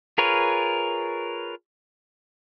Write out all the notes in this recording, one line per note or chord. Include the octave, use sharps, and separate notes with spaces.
F4 G#4 A#4 B4 C#5